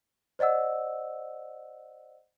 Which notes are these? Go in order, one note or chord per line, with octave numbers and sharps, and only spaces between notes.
C5 D5 D#5 F#5 E6